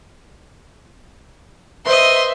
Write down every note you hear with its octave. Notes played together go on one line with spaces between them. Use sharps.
B4 C5 D#5 E5 C6